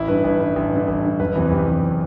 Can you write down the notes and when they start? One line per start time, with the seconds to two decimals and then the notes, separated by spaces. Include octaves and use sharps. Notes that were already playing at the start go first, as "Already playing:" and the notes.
Already playing: A1 E4
0.08 G2 D3 B4
0.24 A1 B4
0.40 G2 D3 B4
0.56 A1
0.72 G2 D3
0.88 A1
1.04 G2 D3
1.20 F#1 B4
1.36 E2 C3 E3
1.51 F#1 G4
1.68 E2 C3 E3